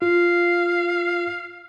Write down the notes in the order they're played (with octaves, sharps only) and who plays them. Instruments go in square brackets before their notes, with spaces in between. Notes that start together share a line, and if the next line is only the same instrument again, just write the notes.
[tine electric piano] F4 [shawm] F5